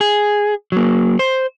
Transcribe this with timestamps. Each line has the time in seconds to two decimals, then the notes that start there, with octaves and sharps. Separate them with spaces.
0.01 G#4
0.72 F#3 A#3
1.19 C5